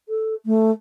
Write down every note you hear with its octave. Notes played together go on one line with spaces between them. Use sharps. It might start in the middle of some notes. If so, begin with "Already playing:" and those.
A4
A3